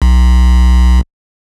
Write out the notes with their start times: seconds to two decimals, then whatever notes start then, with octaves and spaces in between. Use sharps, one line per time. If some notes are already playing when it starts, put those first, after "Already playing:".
0.02 B1